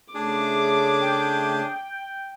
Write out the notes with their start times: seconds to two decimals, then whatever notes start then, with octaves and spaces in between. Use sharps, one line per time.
0.14 C#3 A3 D4 G#4 D6
1.01 G5